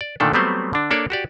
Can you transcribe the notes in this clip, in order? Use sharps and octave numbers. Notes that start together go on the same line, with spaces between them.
D5
A#2 D3 D#3 A3 D4 A4
F#3 G3 A3 B3 C4 C5
D3 D4
A#3 D4 A4 C#5 D5
F#4 G4 D5